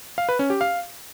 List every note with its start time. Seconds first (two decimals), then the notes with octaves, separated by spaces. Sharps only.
0.18 F5
0.29 B4
0.39 C#4
0.50 G4
0.61 F5